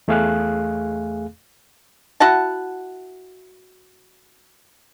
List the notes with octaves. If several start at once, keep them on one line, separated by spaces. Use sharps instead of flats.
E2 A3 G#4 F5 G#5 F#6
E4 F#4 F#5 A5